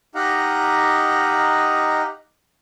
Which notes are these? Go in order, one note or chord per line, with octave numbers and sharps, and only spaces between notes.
D#4 G4 D#5 F5 F#5 A#5